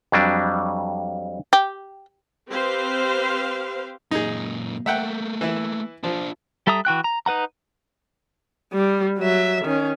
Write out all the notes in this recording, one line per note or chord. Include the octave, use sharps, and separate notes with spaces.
F2 F#3 G3 D4
G4
C4 G4 B4 C5 F5
F#2 A#2 D#4 G#4
A3 A#3 E5 F#5 G5
E3 E4
F3 D4 F4
G3 A4 E5 A#5 D#6
E3 F#4 G5 F#6
A#5
D#4 B4 F#5 A#5
G3
F#3 E5
D#3 C#4